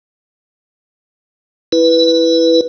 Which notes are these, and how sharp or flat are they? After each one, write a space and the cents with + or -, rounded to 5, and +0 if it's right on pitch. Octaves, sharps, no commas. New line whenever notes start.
E4 +0 B4 +0